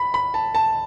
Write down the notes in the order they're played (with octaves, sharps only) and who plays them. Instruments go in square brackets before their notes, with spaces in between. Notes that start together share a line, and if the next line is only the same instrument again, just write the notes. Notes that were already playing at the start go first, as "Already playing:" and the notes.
Already playing: [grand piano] B5
B5
A5
A5